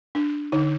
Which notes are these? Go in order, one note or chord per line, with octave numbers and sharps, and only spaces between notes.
D4
D3 D#4